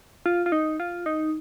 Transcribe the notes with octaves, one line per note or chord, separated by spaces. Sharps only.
F4
F4
D#4
F4
D#4